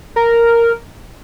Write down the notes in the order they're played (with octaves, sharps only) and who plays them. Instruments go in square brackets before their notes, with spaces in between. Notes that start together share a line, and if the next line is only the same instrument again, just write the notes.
[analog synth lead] A#4